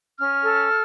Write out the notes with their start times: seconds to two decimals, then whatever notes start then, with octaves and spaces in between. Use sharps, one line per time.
0.18 C#4 F6
0.44 A4